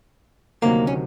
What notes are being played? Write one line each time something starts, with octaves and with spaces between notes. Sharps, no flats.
D2 C3 D#3 F#3 A#3
C#4